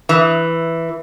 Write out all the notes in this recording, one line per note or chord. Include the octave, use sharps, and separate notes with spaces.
E3